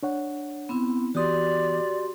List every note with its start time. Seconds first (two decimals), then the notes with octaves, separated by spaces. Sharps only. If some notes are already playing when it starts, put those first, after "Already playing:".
0.03 D4 C#5 F#5
0.69 B3 C4 E4
1.15 E3 B3 F#4 G4 D5 C6 D#6